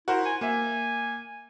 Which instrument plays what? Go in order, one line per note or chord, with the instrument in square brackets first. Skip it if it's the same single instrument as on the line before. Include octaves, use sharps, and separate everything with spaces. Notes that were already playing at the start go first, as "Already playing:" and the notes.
[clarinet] E4 [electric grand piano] F#4 A#4 C5
[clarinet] G#5
[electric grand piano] A#3 E5 [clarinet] G#5